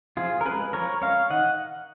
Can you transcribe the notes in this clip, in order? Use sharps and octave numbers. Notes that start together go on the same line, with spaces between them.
F3 F4 G#4
A#4
G#3 C#4 G#4 B4
F3 A#4 C#5
G#3 C#4 C#5 F5
D#3 D#5 F#5